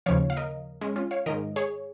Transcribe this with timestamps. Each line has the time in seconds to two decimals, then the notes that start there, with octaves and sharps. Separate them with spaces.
0.06 D#2 C#3 F3 C#5 F5
0.30 F5
0.37 A#4 D#5
0.81 G#3 C#4
0.96 C#4 F4
1.11 C#5 F5
1.26 G#2 D#3 A#4 D#5
1.56 G#4 C#5